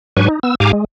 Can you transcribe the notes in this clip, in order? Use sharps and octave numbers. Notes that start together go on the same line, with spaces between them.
G#2 F#3 D4 B4 G#5 C#6
D#4
B3 E6
G#2 G4 F5 G#5 A#5 D6
G#3